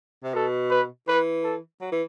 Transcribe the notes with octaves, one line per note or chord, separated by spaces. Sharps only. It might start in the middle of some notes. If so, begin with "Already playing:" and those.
C3
B2 A4
B4
E3 B4
A4
F#3
E3